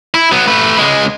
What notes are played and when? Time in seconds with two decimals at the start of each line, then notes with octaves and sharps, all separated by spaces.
0.14 E4
0.32 F#3 B3
0.48 A3 B4
0.78 C#2 G#3